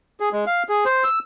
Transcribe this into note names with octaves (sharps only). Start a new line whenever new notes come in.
G#4
G#3
F5
G#4
C5
E6